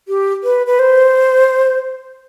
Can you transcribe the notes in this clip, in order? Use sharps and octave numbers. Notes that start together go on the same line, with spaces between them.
G4
B4
B4
C5